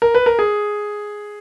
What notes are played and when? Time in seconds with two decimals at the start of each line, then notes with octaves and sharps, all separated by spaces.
0.02 A#4
0.15 B4
0.26 A#4
0.39 G#4